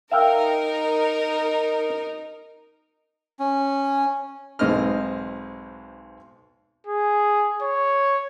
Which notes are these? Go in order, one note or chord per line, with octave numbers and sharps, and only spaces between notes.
D#4 A#4 E5 F5 G5
C#4
B1 G#2 C4 D#5 F6
G#4
C#5